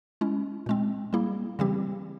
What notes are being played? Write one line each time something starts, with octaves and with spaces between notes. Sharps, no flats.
G#3 C#4 E4
A#2 G#3 C4
G3 A#3 E4 G#4
C#3 E3 G3 C4 G4